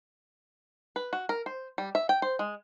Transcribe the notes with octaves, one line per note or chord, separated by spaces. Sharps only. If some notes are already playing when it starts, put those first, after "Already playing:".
B4
F#4
A#4
C5
G3
E5
G5
C5
G#3